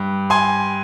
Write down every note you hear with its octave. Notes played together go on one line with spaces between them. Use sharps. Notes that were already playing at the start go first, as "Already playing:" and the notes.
Already playing: G2
G#5 C6